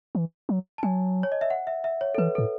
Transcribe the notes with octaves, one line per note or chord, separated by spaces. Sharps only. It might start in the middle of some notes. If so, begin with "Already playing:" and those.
E3
F#3
A5
F#3 G#5
C#5
D#5
E5
F#5
E5
E5
C#5
A4
E3 B4
A4
A2